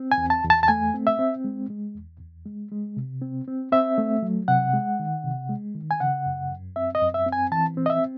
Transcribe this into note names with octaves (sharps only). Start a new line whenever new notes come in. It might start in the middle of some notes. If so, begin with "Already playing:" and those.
Already playing: C4
G#5
E2
A5
E2
A5
A5
A3 G#5
C4
E5
C4
G#3
G#3
E2
E2
G#3
G#3
C3
C4
C4
C4 E5
A3
F#3
C3 F#5
G#3
D#3
C3
G#3
D#3
G#5
C#3 F#5
F#2
F#2
C4 E5
D#5
F#2
E5
C4
G#5
E3 A5
C4
D#5
E5